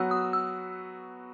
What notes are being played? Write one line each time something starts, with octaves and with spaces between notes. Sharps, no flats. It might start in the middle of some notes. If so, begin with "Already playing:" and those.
Already playing: F#3 B3 F#4 E6
D#6
E6